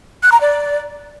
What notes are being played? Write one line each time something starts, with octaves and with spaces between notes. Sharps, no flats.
F#6
A#5
D5